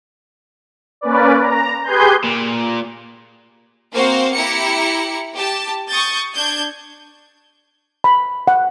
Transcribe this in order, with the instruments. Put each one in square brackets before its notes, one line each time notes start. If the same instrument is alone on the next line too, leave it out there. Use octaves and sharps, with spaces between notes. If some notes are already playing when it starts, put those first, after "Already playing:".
[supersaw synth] A#3 C#4 B4 D5
A#5
G4 G#4 B4 G#5 C6 G6
[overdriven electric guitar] A#2
[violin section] A#3 C4 F#4 C5 F5
E4 G4 A#5 C#7
G4 A5
C#6 D#6 G6 A6
D4 G6 G#6
[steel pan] B5
F#5